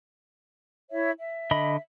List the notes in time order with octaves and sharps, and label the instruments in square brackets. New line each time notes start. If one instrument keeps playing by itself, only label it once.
[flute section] E4 C#5 E5
E5
[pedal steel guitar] D3 D#5 B5